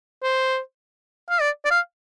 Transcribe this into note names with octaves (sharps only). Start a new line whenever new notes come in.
C5
F5
D5
D5
F5